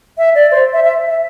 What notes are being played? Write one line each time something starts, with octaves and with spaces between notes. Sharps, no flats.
E5
D5
C5
E5
E5
E5